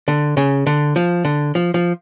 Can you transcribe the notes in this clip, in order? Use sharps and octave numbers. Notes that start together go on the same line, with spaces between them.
D3
C#3
D3
F3
D3
F3
F3